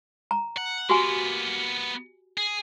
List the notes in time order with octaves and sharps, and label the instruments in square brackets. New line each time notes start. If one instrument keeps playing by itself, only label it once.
[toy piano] A#5
[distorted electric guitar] F#5
[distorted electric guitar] A#3 B3 [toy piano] F#4 G4 G#5
[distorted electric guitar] G#4